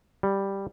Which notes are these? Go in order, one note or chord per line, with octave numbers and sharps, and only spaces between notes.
G3